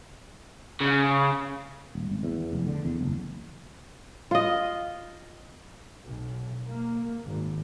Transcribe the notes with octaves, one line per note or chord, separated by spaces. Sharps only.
C#3
D#1
G#1
E2
F1
D3
E2
F#1
F4 D#5
B1
A#3
G#1